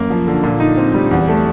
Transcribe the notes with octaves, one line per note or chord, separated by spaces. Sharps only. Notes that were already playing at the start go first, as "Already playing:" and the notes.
Already playing: F#2 A#3
F3
D3
A#2
D#4
C4
G3
E2
A3